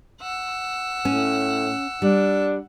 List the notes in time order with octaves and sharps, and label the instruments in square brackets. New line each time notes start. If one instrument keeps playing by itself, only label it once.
[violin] F#5 E6
[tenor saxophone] A2 [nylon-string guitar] C#4
[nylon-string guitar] G3 [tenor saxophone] D4